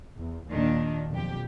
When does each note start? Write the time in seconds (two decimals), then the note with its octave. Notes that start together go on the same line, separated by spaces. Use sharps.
0.16 E2
0.50 D#2 A#2 D#3 D4
1.11 B1 F2 G4